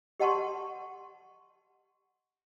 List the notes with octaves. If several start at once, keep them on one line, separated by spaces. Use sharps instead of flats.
G4 D#5 F#5 A5 C6 C#6